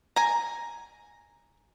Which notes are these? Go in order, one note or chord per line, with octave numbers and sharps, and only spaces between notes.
G#5 A#5